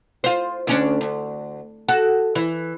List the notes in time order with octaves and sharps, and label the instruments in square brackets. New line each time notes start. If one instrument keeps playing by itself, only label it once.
[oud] F4 C5
D2 C#4 D4
D2
F#4 A4
E3